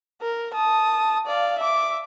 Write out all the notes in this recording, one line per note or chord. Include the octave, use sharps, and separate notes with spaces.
A#4
A5 D#6
D5 F5
E5 D6